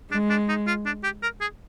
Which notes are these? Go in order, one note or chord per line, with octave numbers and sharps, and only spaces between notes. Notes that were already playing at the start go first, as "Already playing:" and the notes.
G#3 D4
D4
D#4
F4
D4
G4
A#4
G#4